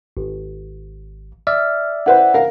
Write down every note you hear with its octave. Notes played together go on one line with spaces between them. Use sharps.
G#1
D5 E5 F6
E4 B4 C5 F#5
A#4 F5